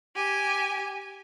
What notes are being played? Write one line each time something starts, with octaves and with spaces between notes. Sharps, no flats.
G4 G#5